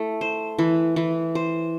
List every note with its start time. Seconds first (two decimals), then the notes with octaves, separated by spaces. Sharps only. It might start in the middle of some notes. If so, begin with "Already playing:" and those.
Already playing: A3 E4
0.21 C5
0.59 E3
0.96 E3
1.35 C5